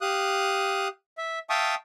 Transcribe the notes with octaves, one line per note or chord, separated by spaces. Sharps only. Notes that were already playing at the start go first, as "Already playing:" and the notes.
G4 F5 D#6 F#6
E5
E5 F5 G5 A5 C#6 D#6